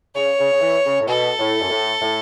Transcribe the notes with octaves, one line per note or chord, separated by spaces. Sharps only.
C#3 C#5
C#3
C#3
E3
C#3
A2
B2 A4
A2
F#2
A2
A2